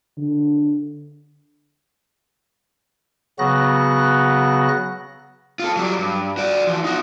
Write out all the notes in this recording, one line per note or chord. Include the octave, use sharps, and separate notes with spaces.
D3
C#3 F#3 B3 F#4 F#6 A#6
F4 A4
F#3 G3
G2
F#4 D5
E3 F3
D#4 F#4